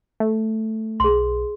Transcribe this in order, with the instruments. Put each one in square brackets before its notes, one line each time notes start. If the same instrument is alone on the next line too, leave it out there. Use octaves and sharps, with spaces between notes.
[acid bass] A3
[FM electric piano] B1 [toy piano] G#4 C6